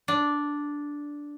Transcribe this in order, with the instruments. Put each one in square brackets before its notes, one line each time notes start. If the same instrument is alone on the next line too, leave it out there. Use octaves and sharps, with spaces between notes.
[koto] D4